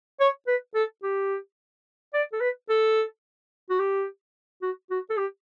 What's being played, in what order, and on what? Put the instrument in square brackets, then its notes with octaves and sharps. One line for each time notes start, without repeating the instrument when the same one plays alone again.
[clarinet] C#5
B4
A4
G4
D5
A4
B4
A4
F#4
G4
F#4
F#4
A4
G4